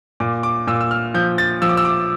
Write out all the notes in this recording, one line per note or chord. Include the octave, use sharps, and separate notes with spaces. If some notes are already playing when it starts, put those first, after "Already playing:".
A#2 D6
D6
A#2 E6
E6
F6
F3 G6
A6
F3 E6
D6
E6
D6